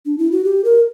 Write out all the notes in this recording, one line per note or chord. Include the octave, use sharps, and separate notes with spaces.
D4
E4
F#4
G4
A#4